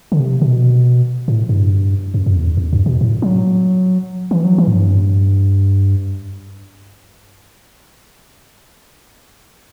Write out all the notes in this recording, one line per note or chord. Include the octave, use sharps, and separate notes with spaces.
D3
C3
B2
A2
G2
F#2
F#2
E2
E2
G2
B2
A2
F#3
E3
F#3
E3
A2
G2